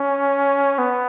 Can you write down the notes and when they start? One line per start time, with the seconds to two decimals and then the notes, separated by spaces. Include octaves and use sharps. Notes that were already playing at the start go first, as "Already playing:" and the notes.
Already playing: C#4
0.78 B3